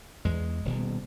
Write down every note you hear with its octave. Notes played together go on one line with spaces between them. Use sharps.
E2 G#3
D#1 B2